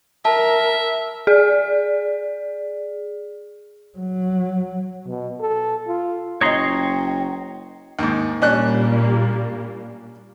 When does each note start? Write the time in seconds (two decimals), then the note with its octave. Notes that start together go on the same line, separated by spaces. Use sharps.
0.25 A#4 E5 A5
1.27 G#4 D5
3.99 F#3
5.07 B2
5.40 A4
5.87 F4
6.41 F#1 C#5 D#5 G5 A#5 C6 D#6
7.99 D#2 G#2
8.42 A#2 G3 A#3 C#4 D4 F#6